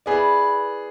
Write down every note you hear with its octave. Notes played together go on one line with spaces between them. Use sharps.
B3 E4 G#4 B4 D5